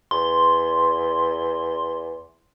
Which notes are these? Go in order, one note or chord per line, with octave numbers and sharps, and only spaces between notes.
E2 C6